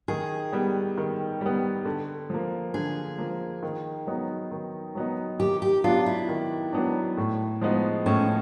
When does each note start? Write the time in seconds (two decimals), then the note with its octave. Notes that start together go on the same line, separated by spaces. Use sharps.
0.08 D#3 G#4
0.52 G3 B3
0.98 D#3
1.41 G3 B3
1.85 D3
2.30 F3 A#3
2.74 D3 G#4
3.18 F3 A#3
3.63 D#3
4.07 F#3 B3 D#4
4.51 D#3
4.95 F#3 B3 D#4
5.40 D#3 G4
5.62 G4
5.84 F#3 B3 D4 F4
6.06 E4
6.29 D#3
6.73 F#3 B3 D4
7.17 A2
7.61 F3 G#3 B3 D#4
8.06 A2 C#4